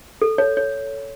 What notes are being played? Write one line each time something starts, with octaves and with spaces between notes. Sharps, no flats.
A4
C#5
C#5